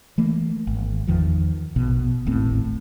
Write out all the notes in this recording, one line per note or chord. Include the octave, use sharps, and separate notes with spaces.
E3 A3 A#3
G#1
E2 D#3 F3
A#1 B2
D#1 G#1 A2 C4